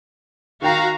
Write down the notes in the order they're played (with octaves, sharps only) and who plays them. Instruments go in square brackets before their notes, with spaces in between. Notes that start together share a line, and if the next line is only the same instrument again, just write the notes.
[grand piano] D#3 G5 [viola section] F#4 F5 A#5